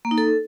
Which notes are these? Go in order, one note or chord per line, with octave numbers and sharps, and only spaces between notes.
A#3
D#4
A4